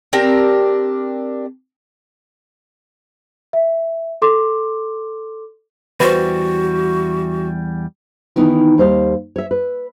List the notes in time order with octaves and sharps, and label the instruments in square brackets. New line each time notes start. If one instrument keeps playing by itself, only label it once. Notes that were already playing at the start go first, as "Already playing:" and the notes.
[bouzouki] C4 D4 G4 A#4
[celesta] E5
A4 C6 D6
[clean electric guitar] E2 G3 [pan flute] F#4 [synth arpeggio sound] B4 C5
[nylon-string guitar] D#3 E3 B3 D#4 E4
D#2 G3 C5 D#5 F5
C#5 E5
B4